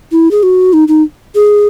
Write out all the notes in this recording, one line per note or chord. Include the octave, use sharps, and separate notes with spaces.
E4
G#4
F#4
D#4
D#4
G#4